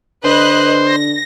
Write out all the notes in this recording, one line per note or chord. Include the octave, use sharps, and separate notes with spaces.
D3 B4 C5 D#5 F#6
A#6